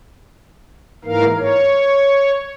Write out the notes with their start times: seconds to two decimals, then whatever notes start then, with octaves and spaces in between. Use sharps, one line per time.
1.05 G#2 E3 A#3 A#4 F5
1.38 C#5